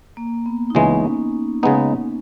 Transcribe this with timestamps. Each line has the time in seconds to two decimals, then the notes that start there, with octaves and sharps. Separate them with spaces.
0.17 A#3
0.46 B3
0.70 D#4
0.75 C#2 C#3 E3 G#3 C#4
1.63 C#3 G#3 B3 D#4